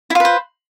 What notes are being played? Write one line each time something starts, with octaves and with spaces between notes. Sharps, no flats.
E4 F4 B4 C5